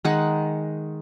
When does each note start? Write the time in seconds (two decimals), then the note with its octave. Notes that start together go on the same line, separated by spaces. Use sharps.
0.05 D#3 G#3 D#4 F#5